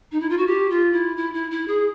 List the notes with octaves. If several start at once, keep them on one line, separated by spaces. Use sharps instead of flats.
D#4
E4
F4
F#4
G4
F4
E4
E4
E4
E4
G#4